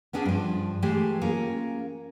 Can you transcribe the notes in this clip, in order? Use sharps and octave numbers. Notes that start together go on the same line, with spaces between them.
B3 C#4 D4 G#4 G#5
G2 F3
E3 G#3 A3 G4 G#4
A#3 C#4 F4 G#4